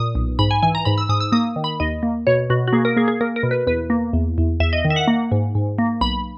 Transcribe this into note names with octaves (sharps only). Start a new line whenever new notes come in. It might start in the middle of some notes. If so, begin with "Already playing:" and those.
Already playing: A#2 D#6
B1
G#2 B5
G#5
E3 G#5
A#5
G#2 B5
E6
G#2 D#6
E6
A#3 D#6
D#3
B5
D#2 D#5
A#3
B2 C#5
B2 F#4
F#4
A#3 G#4
A#4
A#3 G#4
G#4
A#3 A#4
A#4
B2
B4
E2 B4
A#3
E2
E2
E2 E5
D#5
D#3
E5
F#5
A#3
G#2
G#2
A#3
B1 B5